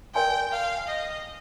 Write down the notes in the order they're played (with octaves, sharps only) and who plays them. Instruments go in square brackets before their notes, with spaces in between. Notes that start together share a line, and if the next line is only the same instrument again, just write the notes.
[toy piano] A#4 D5 G#5 C6 [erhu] G5
[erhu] F5
D#5